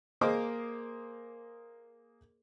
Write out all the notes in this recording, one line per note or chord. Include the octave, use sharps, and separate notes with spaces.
A#3 G#4 A#4 C5 D#5 D6